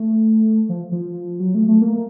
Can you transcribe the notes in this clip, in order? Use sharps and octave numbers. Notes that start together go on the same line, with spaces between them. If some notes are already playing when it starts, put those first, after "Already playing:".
Already playing: A3
F3
F3
F#3
A3
A3
A#3